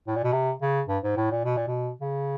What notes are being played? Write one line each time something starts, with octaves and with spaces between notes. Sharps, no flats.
A2
A#2
B2
C3
C#3
G2
G#2
A2
A#2
B2
A#2
B2
C#3